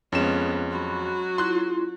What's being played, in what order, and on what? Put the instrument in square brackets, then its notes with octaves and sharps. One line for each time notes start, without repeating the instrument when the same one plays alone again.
[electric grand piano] F2 E7 [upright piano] G#3 C#4 [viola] B3 F4
[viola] F#3 F#4 [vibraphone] B5 C6
[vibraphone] E4 F4 [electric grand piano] C6 F#6